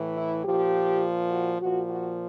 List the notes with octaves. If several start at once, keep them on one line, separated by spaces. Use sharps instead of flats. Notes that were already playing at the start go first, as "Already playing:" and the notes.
Already playing: A2 E3
E4
A#2 F3 G4
F#4
A#2 F3 F#4
F#4